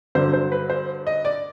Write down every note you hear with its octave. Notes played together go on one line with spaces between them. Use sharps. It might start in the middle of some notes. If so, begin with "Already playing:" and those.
G2 D3 F#3 C5
C5
B4
C5
D#5
D5